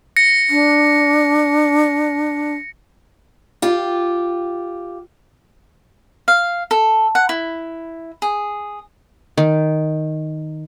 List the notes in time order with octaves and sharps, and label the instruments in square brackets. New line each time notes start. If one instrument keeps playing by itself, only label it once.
[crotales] A#6 C#7
[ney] D4
[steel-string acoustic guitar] F4 G4
[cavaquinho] F5
A4
F#5
E4
G#4
[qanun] D#3